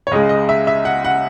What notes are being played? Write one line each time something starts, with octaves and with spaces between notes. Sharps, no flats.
C#5
C#2 C#3 G#3 D#5
D#5
E5
E5
F#5
F#5